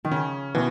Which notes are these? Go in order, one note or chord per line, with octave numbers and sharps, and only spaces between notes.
D#3
C#3 C#4
B2 D#3 E3